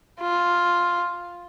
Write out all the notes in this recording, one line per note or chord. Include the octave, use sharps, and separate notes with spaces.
F4